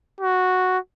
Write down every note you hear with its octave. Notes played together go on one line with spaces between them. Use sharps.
F#4